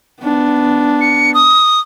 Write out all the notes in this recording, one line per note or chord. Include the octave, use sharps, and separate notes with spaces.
B3 D4
C#7
D#6